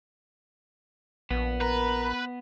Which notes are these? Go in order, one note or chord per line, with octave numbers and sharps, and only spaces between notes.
A#1 B3
A#4 B4